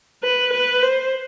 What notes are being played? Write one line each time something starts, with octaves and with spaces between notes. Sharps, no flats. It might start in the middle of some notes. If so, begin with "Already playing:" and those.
B4
B4
C5